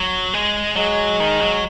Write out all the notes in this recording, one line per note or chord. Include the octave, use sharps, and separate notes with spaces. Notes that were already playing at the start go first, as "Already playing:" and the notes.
Already playing: F#3
G#3
F#3 G#3
D#3
F#3